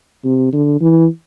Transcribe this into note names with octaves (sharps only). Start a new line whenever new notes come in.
C3
D3
E3